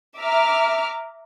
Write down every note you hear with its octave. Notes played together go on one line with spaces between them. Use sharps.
E5 A#5 D6 F6